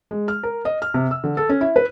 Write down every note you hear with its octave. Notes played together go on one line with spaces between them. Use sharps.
G#3
F6
A#4
D#5
F6
C3
E6
D3
A4
C#4
E4
B4